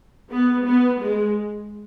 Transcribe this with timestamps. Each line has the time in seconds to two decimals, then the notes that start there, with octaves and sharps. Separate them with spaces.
0.31 B3
0.66 B3
1.01 G#3